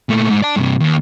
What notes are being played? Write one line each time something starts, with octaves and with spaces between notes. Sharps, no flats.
A#2 A3
G#2
D5 A5
G2 C3
D#2